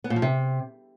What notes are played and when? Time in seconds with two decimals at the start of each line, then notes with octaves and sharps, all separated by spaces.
0.04 B3
0.10 A#2
0.16 F3
0.22 C3